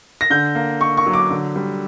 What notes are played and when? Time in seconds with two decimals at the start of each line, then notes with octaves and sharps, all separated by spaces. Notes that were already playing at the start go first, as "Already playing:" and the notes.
0.21 A#6
0.30 D3 G6
0.55 A#3
0.81 A#3 C#6
0.97 C#6
1.06 F#3
1.14 D6
1.30 D3
1.56 G3